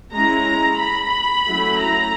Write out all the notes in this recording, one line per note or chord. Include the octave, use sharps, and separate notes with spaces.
G#3 C#4 E4 A#5
B5
F#3 A3 C#4 E4
A#5